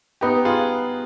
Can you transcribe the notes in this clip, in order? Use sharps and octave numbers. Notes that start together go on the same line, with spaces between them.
B3 D#4 G4
F4 G#4